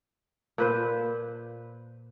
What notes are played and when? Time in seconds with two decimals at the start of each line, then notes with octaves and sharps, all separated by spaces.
0.58 A#2 B4 C5